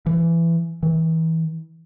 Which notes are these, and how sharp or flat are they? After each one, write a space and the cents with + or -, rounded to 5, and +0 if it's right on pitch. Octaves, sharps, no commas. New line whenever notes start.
E3 +20
E3 -30